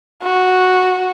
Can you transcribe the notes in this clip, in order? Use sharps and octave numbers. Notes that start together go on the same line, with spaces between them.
F#4